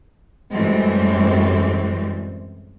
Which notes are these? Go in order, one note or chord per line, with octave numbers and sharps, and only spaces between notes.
F#2 A2 E3 G3 G#3 C4